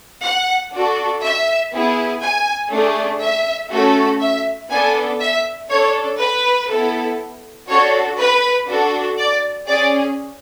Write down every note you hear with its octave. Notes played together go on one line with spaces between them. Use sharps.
F#5
D4 F#4 A4
E5
B3 E4 G#4
G#5
A3 D4 G#4
E5
A3 C#4 F#4 A4
E5
B3 D4 A4 G#5
E5
D4 A4 C#5
B4
B3 E4 A4
D4 F#4 A4 C#5
B4
D4 F#4 A4
D5
C#4 G#4 D5